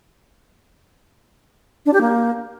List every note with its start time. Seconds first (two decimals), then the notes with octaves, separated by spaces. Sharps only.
1.86 D4
1.93 G4
2.01 A#3